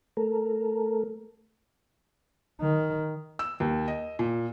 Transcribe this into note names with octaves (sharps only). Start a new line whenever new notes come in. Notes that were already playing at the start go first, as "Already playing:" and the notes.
A3 A4 A#4
D#3
E6
D#2
D#5
A#2